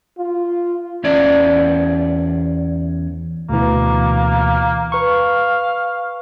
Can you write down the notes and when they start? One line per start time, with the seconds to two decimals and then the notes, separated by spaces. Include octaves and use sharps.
0.18 F4
1.04 E2 C#4 D5
3.49 D2 B2 E3 A#3
4.92 B4 F5 C#6